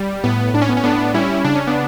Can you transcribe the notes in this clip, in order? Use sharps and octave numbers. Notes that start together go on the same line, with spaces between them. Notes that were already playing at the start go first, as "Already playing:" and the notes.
Already playing: G3
A2 B3
A2 D4
C#4
B3
C#4
A2 B3 D4
G3 C#4 E4
C#3 D4
C#4
B3 D4